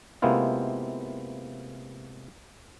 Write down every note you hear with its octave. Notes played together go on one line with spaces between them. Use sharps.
C3 G#3 A#3 B3 E4 F4